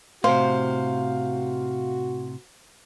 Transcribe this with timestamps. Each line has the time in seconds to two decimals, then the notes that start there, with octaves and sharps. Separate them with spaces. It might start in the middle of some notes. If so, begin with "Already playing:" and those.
0.24 A2 C3 F#4 C5 F5